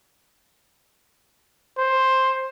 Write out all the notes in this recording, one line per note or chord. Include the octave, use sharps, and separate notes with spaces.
C5